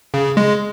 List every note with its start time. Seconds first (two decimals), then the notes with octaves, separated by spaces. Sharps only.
0.14 C#3
0.37 G#3